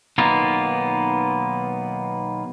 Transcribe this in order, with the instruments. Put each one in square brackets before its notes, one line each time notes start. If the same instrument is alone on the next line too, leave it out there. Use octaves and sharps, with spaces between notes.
[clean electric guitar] B1 D#3 A#3 B3 F4